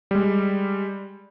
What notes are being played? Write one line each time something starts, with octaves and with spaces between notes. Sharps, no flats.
G3 G#3